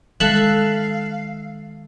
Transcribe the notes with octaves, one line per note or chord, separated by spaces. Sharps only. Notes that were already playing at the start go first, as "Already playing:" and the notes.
D#3 G#3 A4 E5 F5 F#6